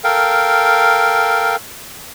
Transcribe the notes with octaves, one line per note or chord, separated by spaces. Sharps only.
A4 A#4 F5 G5